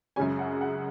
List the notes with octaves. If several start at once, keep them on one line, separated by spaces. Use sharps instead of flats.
F#2 C#3 G#3 C#4 G#5
F#5
F#5